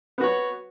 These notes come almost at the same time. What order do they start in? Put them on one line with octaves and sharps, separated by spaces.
B3 F#4 C#5